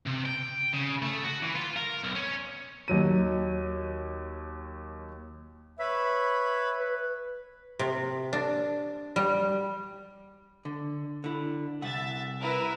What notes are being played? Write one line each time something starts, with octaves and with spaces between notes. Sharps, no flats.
C3
G5
C#3
A3
F#4
E3
F4
A#4
B1
C#4
D#2 F#3 D#7
B4 C#5 E5 B5
B4
C3
D4
G3
D3
D3 E4
C2 E5 F#5 A6
E4 A#4 B4